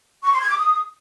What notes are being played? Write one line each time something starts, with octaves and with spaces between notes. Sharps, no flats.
C#6
C6
G#6
D6
D#6